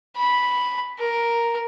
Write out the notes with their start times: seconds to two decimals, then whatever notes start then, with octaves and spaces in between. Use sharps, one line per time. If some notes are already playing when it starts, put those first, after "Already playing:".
0.16 B5
0.99 A#4